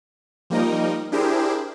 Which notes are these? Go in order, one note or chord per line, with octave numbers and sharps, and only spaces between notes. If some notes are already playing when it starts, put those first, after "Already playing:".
F3 G3 A#3 D#4 A#4 D#5
D4 E4 G4 G#4 A#4 C5